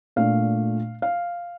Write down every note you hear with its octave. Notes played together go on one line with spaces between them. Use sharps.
A#2 A3 D4 F5
F5